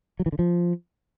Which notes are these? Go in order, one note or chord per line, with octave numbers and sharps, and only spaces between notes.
F#3
E3
D3
F3